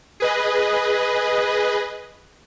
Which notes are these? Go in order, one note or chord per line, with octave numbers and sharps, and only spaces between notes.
G#4 B4 D#5